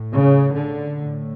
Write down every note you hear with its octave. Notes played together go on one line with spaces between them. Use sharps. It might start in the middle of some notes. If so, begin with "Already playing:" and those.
Already playing: A2
C#3
D3
A2